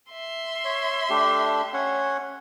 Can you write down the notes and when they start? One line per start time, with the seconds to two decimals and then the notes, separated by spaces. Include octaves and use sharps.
0.11 E5 C6
0.65 C#5
1.10 A3 D4 G4
1.74 C#4 C#5 F#5